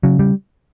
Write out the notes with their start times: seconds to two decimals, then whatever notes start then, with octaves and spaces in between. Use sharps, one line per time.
0.03 C#3 F#3
0.19 G3